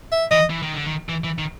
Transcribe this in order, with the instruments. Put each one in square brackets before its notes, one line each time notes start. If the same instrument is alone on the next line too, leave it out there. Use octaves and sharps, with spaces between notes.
[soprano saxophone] E5
[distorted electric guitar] E3 [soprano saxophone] D#5
[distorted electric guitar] E3
D#3
D3
D#3
E3
E3
D#3